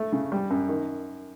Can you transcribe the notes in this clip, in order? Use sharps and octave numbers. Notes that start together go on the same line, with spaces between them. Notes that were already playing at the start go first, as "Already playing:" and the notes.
Already playing: A3
C#3
G3
F#2
D#3